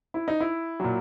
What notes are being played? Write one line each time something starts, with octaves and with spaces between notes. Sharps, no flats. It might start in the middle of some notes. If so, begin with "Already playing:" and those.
E4
D#4
E4
A#2 F#3